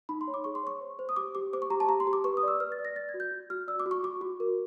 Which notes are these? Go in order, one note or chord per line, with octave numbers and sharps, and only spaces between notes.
D#4 B5
C6
C#5
D6
G#4 C#6
C6
C#5 C#6
C5
C5
D#6
G4 D6
G4 D6
C5 D6
C#6
G4 A#5
A5
G4 A#5
C6
G4
D6
B4 C#6
D#6
D5 E6
B4 F6
A6
D5
A#6
D5 A6
G#6
F#4
G6
F#4
F#4 F6
D5 E6
D6
F#4
C#6
F#4 D6
F#4
A#4